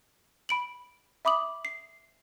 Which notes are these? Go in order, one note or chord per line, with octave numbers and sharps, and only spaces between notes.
B5 D7 F#7
E5 B5 D6 D#6 F#7
C7